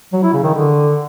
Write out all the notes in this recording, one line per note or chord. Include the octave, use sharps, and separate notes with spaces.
F#3
E4
C#3
D#3
D3